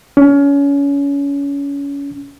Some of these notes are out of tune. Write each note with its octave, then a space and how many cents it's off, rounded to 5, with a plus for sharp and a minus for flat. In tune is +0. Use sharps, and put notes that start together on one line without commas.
C#4 +25